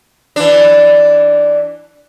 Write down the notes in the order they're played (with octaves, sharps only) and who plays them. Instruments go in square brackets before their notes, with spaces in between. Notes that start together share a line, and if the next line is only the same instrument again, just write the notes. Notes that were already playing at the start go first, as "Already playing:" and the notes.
[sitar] E3 D4